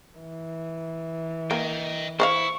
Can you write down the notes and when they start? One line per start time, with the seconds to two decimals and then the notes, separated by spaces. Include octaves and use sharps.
0.19 E3
1.51 A#3 D#5 G5
2.20 E4 C5 C#5 F5 C#6